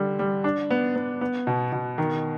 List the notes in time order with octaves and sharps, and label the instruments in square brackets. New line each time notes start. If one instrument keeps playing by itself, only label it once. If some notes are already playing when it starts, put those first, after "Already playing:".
Already playing: [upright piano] D3 G3
G3
D4
B3
B3
B3
B2
B2
D#3